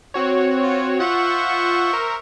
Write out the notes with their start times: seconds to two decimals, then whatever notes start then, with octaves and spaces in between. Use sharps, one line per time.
0.14 C4 F#4 C#5
0.63 F4
1.00 F4 C5 E5 F#5 C#6
1.93 A#4